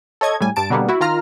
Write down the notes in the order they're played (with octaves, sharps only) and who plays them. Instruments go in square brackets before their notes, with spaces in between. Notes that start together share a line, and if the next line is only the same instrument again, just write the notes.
[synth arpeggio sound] A4 C#5 D#5 G#6
A2 G3 G#5
G2 A5 D7
B2 D3 G3 A#3 B3
E4 F#4
D#3 F4 A#5 F6